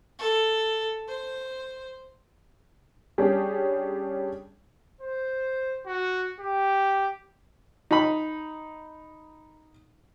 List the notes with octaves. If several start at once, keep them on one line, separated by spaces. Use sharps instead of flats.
A4
C5
G3 C#4 D4 G4 G#4
C5
F#4
G4
D#4 B5